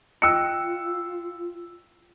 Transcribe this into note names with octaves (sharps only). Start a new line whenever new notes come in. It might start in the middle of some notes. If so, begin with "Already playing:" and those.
F4 D#5 G5 E6 F#6 C#7